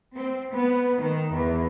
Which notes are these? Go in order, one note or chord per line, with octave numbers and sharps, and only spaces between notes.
C4
B3
D#3
E2